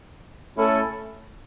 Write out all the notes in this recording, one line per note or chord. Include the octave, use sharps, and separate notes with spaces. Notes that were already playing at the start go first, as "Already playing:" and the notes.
A3 C#4 E4 A4